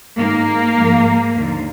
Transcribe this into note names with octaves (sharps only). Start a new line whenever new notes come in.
G#2 D#3 A#3
G#2 F3
D#2 D3 F3